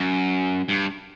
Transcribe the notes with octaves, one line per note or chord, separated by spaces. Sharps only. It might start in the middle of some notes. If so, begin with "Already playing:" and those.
Already playing: F#2
G2